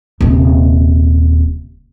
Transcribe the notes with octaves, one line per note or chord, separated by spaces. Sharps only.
D#1 C3